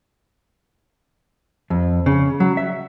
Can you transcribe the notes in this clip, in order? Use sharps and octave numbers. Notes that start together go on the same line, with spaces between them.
F2
C#3
F#3
E5